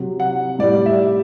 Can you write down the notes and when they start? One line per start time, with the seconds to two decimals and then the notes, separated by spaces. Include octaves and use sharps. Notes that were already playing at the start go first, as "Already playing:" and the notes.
Already playing: C3 F#3
0.20 F#5
0.59 A2 G3 D5
0.86 E5